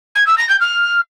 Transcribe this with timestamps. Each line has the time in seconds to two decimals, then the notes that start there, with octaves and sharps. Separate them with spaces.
0.15 G#6
0.26 E6
0.37 A#6
0.49 G6
0.60 F6